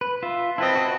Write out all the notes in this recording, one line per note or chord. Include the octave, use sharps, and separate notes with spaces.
B4
F4 E5
C4 E4 B4 D#5 A5
F#4 B4 D#5